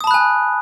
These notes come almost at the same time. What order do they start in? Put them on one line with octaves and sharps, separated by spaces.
D#6 A5 B5 F#6 G#5